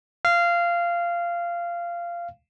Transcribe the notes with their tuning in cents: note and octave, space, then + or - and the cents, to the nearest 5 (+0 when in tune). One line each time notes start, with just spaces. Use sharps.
F5 -15